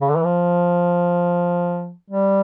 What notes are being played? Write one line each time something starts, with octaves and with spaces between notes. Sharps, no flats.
C#3
D3
E3
F3
G3